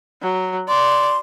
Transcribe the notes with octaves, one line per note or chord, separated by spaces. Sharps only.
F#3
D5 C6